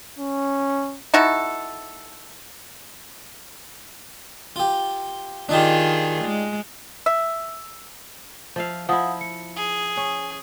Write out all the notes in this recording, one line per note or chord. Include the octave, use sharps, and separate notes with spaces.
C#4
D#4 E4 F#4 A4
F4 G4
D#3 D4 D#4 F4 G4 G#4
G#3
E5
F3 E5 F5
F3 E4 F5 F#5 D#6
C#7
G#4
C#4